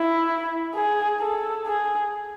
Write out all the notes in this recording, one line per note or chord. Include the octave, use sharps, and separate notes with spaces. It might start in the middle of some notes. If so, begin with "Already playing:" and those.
Already playing: E4
G#4
A4
G#4